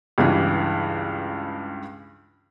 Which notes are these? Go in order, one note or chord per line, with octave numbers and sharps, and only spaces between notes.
C#2 G2 E3